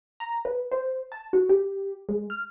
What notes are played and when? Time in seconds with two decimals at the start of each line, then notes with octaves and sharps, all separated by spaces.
0.20 A#5
0.45 B4
0.72 C5
1.12 A5
1.33 F#4
1.49 G4
2.09 G#3
2.30 F6